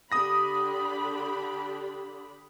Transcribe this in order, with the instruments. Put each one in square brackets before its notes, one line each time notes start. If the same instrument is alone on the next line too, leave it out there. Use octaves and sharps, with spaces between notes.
[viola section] D3 G4 B5 [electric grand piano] D#6 A#6